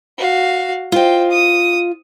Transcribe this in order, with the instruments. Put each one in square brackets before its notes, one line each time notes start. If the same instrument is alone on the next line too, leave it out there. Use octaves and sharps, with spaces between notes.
[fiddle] F#4 F5
[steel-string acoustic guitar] F4 D#5 [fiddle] C5 G5
[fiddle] D#6